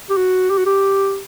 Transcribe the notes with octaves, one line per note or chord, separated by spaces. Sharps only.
G4
F#4
G4
F#4
G4